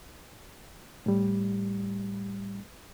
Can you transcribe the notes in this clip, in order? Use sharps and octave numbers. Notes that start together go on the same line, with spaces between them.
A2 G3